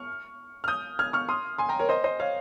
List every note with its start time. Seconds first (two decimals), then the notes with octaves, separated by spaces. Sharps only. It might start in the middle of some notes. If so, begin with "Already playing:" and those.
Already playing: C#6 F6
0.64 F6
0.68 D#6 G6
0.99 F6 G#6
1.13 C#6 F6
1.29 C6 D#6
1.58 G#5 C6
1.69 G5 A#5
1.79 A#4 C#5
1.89 C5 D#5
2.04 C5 D#5
2.20 C#5 F5